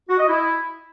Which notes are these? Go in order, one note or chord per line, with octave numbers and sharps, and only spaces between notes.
F#4
D#5
E4